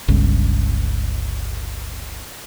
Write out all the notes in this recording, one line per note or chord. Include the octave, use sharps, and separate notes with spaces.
G1 C#2